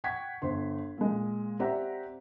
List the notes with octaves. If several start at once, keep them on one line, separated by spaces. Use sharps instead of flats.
F#5 G5 C#6 G#6 B6
G1 C5 C6
A#2 G#3
C4 G4 D5 E5 F#5 A#5